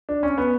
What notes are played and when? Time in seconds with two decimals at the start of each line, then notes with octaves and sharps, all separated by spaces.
0.09 D4
0.23 C#4
0.38 B3